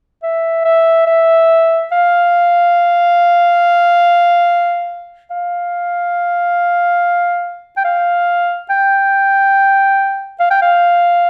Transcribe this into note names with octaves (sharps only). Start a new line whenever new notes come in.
E5
E5
E5
F5
F5
G5
F5
G5
F5
G5
F5